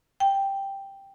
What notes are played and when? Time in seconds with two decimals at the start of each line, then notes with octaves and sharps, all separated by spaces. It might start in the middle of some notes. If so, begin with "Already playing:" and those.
0.20 G5